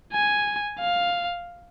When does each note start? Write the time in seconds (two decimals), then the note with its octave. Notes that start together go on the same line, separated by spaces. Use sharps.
0.12 G#5
0.79 F5